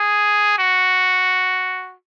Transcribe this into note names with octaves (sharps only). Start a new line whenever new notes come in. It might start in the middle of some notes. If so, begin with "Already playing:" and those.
Already playing: G#4
F#4